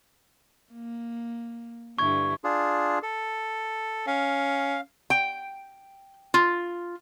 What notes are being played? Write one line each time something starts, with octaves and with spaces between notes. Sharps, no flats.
A#3
G2 D3 E4 C#6 G#6
D4 F4 G#4
A4
C#4 F5
G5
F4